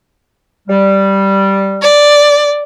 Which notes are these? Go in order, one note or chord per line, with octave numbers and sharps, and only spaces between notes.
G3
D5